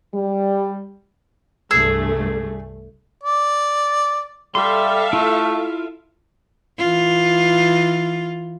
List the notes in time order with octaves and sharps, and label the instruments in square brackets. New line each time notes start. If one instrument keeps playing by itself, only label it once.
[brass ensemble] G3
[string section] C2 G2 A3 [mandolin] G#4 E6
[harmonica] D5
[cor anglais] G3 [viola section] A4 E5 F5 [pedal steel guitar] C6
[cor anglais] A3 [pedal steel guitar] E4 F4
[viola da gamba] E3 F4